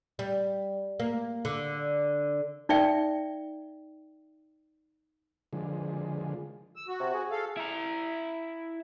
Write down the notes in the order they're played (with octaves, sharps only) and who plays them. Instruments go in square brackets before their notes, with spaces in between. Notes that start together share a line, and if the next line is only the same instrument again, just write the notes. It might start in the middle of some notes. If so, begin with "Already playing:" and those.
[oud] G3
A#3
D3
[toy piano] D#4 D5 E5 G5
[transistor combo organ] D3 F3 G#3
[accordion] E6
F#4
[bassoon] C3
G#4
[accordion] A4 F5
[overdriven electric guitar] E4 A#5